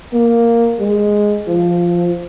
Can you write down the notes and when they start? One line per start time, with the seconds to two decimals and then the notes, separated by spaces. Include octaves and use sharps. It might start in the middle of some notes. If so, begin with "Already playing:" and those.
0.14 A#3
0.80 G#3
1.48 F3